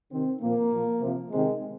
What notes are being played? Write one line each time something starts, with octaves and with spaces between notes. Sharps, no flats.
C3 D#3 C4
A#2 F3 A#3
A#2 F3
C3 F3
C3 D#3 G#3